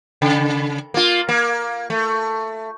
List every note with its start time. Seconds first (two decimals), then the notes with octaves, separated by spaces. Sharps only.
0.22 C#3
0.94 A#3 F4
1.29 A#3
1.90 A3